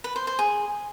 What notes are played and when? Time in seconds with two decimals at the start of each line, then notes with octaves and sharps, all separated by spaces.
0.04 B4
0.16 C5
0.27 C5
0.39 G#4